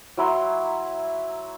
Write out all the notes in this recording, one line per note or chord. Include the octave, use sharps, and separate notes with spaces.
F#3 E4 A#5 C6